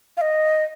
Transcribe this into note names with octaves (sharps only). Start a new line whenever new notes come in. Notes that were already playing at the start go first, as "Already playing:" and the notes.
F5
D#5